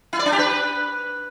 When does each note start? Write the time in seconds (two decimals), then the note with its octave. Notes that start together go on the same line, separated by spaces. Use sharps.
0.13 E4
0.19 D5
0.26 D4
0.32 G4
0.39 B4